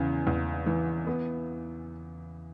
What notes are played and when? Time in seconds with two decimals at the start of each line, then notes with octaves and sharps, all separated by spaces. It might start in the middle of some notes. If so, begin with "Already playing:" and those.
Already playing: E2 C#3
0.27 E2
0.66 E3
1.07 B3